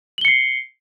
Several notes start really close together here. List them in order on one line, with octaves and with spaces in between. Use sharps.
F#7 G7 C#7 C7